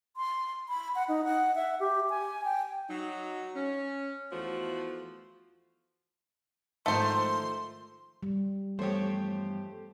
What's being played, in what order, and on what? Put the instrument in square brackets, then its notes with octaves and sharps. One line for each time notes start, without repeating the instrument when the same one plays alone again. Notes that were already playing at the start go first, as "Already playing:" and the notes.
[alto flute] C6
B5
F#5
D#4
F#5
E5
G4
G#5
G5
[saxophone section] F#3 D#4
C#4
E2 F3 A3 F#4
[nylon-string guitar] G#2 D#3 F3 [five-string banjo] A3 C5 [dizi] C6
[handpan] G3
[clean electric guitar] E2 G2 F3 [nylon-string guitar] A3 C#5 [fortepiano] G4 C5